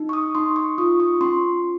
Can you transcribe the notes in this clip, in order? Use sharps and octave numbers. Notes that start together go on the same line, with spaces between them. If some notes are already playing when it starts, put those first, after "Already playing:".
Already playing: D#4
C#6
D#6
D#4 C6
C#6
F4 D#6
C#6
C#4 C6